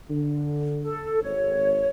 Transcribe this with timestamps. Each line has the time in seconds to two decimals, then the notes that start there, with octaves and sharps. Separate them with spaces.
0.10 D3
0.83 A4
1.23 G#1 C#5